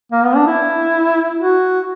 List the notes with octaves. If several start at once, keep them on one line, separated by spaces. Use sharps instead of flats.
A#3
B3
D4
E4
F#4